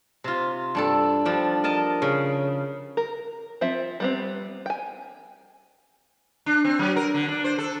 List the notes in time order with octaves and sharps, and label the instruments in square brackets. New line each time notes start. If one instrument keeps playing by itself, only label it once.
[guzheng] C3 F4
G2 D4 A4
F3 G3 D4
A#4 D#5 A5
C#3
[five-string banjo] A#4
F3 C4 E5
G3 B3 C4
G5 G#5
[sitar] D4
C4
F#3
A#4
D3
D4
C5
A4